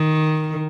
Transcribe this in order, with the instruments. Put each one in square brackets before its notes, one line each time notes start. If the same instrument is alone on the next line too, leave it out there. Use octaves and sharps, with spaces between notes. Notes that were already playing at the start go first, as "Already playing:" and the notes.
Already playing: [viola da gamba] D#3